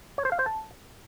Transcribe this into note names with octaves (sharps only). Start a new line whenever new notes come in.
C#5
C5
F5
C5
A5